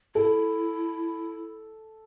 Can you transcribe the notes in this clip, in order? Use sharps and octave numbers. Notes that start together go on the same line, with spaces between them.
E4 A4